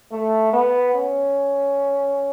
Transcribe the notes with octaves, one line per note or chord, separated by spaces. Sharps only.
A3
B3
C#4